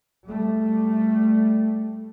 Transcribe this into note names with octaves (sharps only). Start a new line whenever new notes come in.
G3 A3